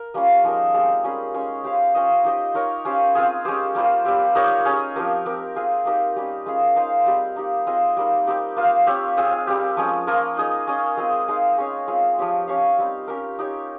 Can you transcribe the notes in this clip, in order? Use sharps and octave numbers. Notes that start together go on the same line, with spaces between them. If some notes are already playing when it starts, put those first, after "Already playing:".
Already playing: A#4
G3 A#3 C#4 F4
F3 G#3 D#4 A#4
G#3 C4 G4
G3 C#4 G#4
G#3 C#4 G#4 C#5
C#4 G4 C5 F5
C#4 F4 C5 D#5
D#4 G4 C5 D#5
D#4 A#4 C#5
C#4 G4 C5 F5
C4 F4 G#4
G#3 C#4 G4 C5
G3 A#3 F4 C5
G3 C4 G4
D#4 G4 A#4 C#5
C#4 G#4 C#5
F3 C4 G4 A#4
C4 G4 A#4
C4 F4 G#4
A#3 D#4 G4 A#4
G3 C#4 G4
G#3 C#4 F4 G#4
D#4 G#4 C5 F5
G3 C4 G4
A#3 D#4 G4
C4 F4 G#4 D#5
G3 A#3 D#4
C4 D#4 G4
A#3 F4 C5 F5
C4 G4 C#5
C4 F4 G#4
G3 C4 G4
F3 G#3 C#4
F3 A#3 F4 A#4
D#4 G#4 D#5
C#4 G#4 D#5
G#3 C4 F4 G#4
G#3 D#4 A#4 F5
C#4 G#4 C#5
G#3 C4 F4
F3 C4 G4 C#5
C#4 G4 C#5 F5
G3 C4 D#4
C#4 G4 A#4
D#4 G4 C#5